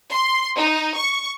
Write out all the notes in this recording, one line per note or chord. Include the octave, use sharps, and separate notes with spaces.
C6
D#4
C#6